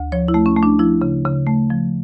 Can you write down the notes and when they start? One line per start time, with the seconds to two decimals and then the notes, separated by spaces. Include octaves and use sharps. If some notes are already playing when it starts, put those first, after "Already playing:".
Already playing: D2
0.12 F3 C#5
0.28 E4
0.34 A3
0.46 C#4
0.56 A3
0.63 D4
0.79 F3 E4
1.02 C#3
1.25 C#3
1.47 A3
1.70 F3